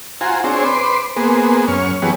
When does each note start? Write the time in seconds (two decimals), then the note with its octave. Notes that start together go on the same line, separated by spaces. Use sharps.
0.21 F4 F#4 C5 G#5 A#5
0.44 C4 D4 G#4 C5 C#5
0.64 B4 C5 C6 D6
1.16 A#3 B3 G#4 C5
1.68 F#2 C#4 C#6 F6
2.02 E3 F#3 B3 G4 G#4 C#5